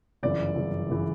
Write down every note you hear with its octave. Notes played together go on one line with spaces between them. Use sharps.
G1 F#2 C#3 E3 D5
G1 F#2 C#3 E3
G1 C#3 E3